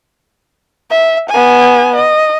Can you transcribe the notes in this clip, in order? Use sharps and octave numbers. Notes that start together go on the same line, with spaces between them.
E5
B3 G#5
D#5